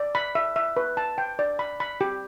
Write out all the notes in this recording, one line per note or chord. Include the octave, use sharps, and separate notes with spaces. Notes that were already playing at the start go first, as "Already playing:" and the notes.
Already playing: D5
B5
E5
E5
B4
A5
G5
D5
B5
B5
G4